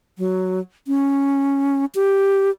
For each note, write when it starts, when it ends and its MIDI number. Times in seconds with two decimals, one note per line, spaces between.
0.18 0.60 54
0.87 1.85 61
1.95 2.50 67